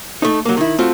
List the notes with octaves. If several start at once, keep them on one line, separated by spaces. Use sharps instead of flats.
A3 D#4
F#3 A#3
D#3 E4
A3 C4 F4 F#4